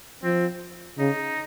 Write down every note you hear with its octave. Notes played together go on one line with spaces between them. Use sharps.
F3 C4
C#3 D#4